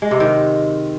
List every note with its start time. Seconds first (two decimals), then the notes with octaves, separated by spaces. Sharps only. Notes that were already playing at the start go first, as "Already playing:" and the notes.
0.02 G#3
0.11 C3
0.20 D#3